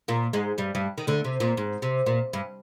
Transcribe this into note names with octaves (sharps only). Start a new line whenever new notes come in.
A#2 A#3
G#2 G#3
G2 G3
G2 G3
D#3
D2 D3
C3
A#2
G#2
C3
A#2
G2